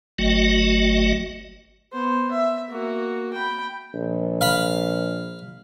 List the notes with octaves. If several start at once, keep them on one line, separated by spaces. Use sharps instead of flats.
G1 F#3 A3 F#4 D#5
B3 C5
E5
A#3 F#4
G5 B5
A#1
F5 B5